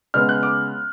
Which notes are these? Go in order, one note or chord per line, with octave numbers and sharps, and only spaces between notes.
C#3 G#3 B3 F6
F#6
D6